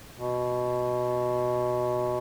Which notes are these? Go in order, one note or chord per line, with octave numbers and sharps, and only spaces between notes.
B2